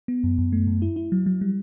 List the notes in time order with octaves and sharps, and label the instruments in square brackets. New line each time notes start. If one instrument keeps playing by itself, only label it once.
[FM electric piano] B3
F#2
F#2
A3
F#2
E4
E4
F#3
F#3
G3